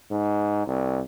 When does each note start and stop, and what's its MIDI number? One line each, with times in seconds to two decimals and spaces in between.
0.11 0.64 44
0.67 1.00 36